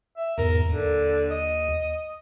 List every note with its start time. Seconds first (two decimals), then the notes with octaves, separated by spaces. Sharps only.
0.17 E5
0.38 E2 G#2 A#4
0.69 D#2 D3
1.31 D#5